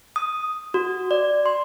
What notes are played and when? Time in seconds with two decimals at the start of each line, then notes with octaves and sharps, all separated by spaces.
0.16 D#6
0.74 F#4
1.11 D5
1.46 C6